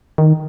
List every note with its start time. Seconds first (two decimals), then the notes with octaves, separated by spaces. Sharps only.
0.18 D#3